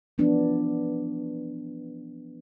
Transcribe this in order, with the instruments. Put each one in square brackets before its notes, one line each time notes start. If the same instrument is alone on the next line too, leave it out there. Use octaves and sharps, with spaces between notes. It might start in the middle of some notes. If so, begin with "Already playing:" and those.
[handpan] E3 F3 B3 D4